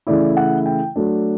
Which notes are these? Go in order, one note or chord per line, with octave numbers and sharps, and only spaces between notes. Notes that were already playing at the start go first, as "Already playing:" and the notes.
C#3 E3 A3 E4 D5
F#5
G5
F#3 A3 D4